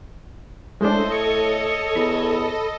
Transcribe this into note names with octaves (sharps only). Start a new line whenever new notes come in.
A2 G#3 D4 A4 C5 D#5
C#5 C#7
E2 B5